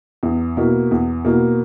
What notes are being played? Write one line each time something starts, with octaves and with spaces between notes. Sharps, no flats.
E2
B2 A#3 E4
E2
B2 A#3 E4